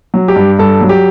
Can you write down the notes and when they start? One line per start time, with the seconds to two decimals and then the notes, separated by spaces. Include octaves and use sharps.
0.14 F#3
0.28 G4
0.36 G2
0.59 G2 A4
0.81 F#3
0.89 G4